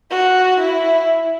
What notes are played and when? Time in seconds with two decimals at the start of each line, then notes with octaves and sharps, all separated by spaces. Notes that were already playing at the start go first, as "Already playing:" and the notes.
0.11 F#4
0.60 E4